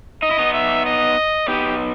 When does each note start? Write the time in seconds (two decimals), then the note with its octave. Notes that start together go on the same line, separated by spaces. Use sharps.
0.23 D#4 D#5
0.31 E4
0.39 B3 D#4
0.53 E5
0.86 D#5
1.48 B3 D#4 G4